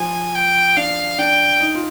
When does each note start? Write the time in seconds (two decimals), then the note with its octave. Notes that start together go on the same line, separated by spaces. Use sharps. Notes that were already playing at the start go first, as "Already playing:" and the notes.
Already playing: F3 G#5
0.35 G5
0.77 D4 F5
1.18 D4 G5
1.60 D#4
1.75 F4